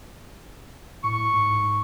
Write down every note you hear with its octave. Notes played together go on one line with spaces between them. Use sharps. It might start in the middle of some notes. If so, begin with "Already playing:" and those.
A2 C#6
G#2